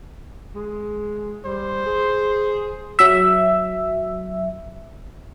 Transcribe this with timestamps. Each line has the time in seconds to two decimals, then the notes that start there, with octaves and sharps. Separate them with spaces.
0.55 G#3
1.46 G3 C5
1.86 G#4
2.99 F#3 E5